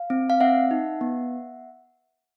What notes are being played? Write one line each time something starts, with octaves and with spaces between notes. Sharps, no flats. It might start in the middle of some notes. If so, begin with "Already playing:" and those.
Already playing: F5
C4
F5
C4 E5 F#5
D#4
B3